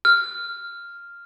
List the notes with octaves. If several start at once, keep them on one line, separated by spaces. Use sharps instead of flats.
F6